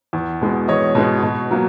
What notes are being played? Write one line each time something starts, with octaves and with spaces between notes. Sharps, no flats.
E2
B2 G#3 B3
E2 C#5 D#5
B2 G#3 B3
B2
F#3 A#3